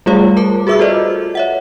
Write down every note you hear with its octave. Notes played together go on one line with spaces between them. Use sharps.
G3 A3 F4 G#4 C#5 F5
A#4 A5 D6
F#4 G#4 B4 E5 D6 E6
F4 A4 C5 D5 D#5
C#5 E5 F#5